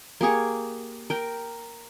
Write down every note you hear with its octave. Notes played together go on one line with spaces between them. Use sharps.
A#3 G4 G#4 C#6
A#4 G5